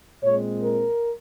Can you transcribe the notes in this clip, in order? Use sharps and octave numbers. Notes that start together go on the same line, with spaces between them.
A#2 G#3 C4 C#5
A#4